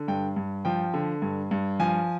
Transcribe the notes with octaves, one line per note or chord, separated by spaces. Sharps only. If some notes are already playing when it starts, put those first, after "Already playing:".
Already playing: D3
G2 G5
G2
F3 G5
D3
G2
G2
F3 G#5